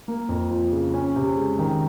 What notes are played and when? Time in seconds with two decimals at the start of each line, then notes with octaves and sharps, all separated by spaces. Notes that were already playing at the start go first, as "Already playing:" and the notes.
0.08 A#3
0.29 F2
0.51 F3
0.72 C#3
0.94 C#4
1.16 C3
1.37 G#3
1.59 D#3